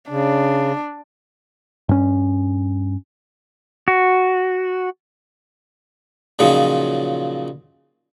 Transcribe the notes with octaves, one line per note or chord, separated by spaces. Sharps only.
C#3 D4
G2 C#4
F#4
A#2 C#3 F3 F#3 D#4